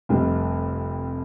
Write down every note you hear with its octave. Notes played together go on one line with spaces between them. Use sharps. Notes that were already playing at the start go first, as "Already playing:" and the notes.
F1 F2 C3 G3 D4